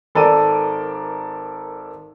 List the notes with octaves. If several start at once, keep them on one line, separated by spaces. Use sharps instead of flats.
G#1 A4 A#4 D5 D6 D#7